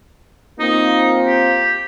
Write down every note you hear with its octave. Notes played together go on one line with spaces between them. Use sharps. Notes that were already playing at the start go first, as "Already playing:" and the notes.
A#3 C4 D#4 F4
G4